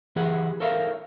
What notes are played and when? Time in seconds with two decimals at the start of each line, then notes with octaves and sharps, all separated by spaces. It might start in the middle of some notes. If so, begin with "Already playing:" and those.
0.16 E3 G4 G#4 F#5
0.60 A4 A#4 C#5 E5 F5